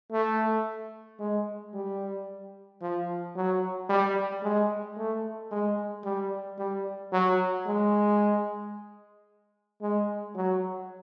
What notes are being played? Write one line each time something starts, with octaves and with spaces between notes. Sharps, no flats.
A3
G#3
G3
F3
F#3
G3
G#3
A3
G#3
G3
G3
F#3
G#3
G#3
F#3